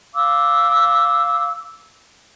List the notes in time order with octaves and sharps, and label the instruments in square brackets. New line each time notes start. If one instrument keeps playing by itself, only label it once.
[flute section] F5 D6 E6